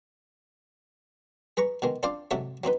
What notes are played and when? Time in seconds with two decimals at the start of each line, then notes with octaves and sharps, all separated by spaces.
1.57 G#4 B4 A#5 C#6
1.82 B2 D#3 G#3
2.03 C4 D4 F4 C5 D5 F5
2.31 G#2 C3 F#3 F#4 A4 E5
2.64 F#3 C4 D#4 B4